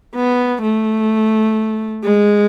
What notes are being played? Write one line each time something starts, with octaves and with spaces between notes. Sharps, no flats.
B3
A3
G#3